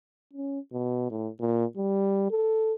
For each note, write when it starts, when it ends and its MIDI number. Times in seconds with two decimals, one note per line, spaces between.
0.33 0.59 61
0.73 1.06 47
1.10 1.29 45
1.41 1.65 46
1.77 2.30 55
2.30 2.74 69